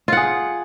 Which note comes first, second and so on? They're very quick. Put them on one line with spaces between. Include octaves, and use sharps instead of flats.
F4 F#5 G#4